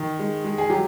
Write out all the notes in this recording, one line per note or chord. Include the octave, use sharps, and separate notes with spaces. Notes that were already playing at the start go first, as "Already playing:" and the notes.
Already playing: D#3
G#3
G#3
G#4
F#3 G4